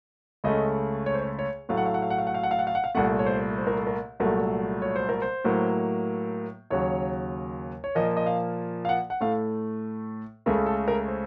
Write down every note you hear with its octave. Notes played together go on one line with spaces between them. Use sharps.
C#2 C#3 A3 D#5
C#5
C5
C#5
C#5
A2 F#3 A3 F5
F#5
F5
F#5
F5
F#5
F5
F#5
F5
F#5
F5
F#5
F5
F#5
F5
C2 A#2 A3 F#5
C#5
C5
C5
A#4
A4
A#4
C2 A#2 F#3 A3 A#4
C#5
C5
A#4
C5
A2 F#3 A#3
D#2 C#3 F#3 C#5
C#5
A#2 F3 A#3 D#5
D#5
F5
F5
F#5
F#5
A2 A3 F5
C#2 C#3 A3 A#4
A4
A#4
C5